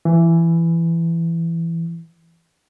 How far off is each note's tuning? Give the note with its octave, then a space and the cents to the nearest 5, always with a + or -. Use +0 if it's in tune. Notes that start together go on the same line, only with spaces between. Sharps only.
E3 +15